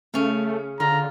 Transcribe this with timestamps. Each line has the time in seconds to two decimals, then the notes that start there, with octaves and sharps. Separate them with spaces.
0.14 C#3 A3 C#4
0.80 D3 F4 A#5